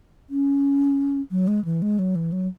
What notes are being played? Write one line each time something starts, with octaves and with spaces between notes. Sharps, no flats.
C#4
F#3
G#3
E3
G#3
F#3
E3
F#3